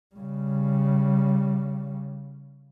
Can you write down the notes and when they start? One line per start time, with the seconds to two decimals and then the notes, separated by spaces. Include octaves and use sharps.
0.15 C#3 G3